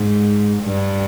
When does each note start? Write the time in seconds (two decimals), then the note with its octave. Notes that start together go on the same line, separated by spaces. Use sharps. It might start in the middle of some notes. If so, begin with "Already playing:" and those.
Already playing: G#2
0.63 G2